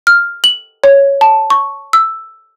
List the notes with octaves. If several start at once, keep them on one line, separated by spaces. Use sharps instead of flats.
F6
F#7
C#5
A5
C#6
E6